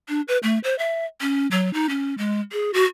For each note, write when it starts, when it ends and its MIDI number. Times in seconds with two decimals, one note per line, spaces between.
0.09 0.21 62
0.28 0.38 71
0.43 0.59 57
0.64 0.77 72
0.79 1.05 76
1.21 1.47 61
1.51 1.72 54
1.74 1.89 63
1.89 2.14 61
2.18 2.40 56
2.52 2.71 68
2.74 2.84 66